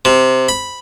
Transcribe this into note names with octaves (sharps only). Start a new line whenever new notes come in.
C3
B5